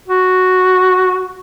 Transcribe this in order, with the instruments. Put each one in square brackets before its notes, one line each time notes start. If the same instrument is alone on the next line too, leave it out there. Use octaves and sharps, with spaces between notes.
[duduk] F#4